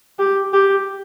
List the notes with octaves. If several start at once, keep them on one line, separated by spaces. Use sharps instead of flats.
G4
G4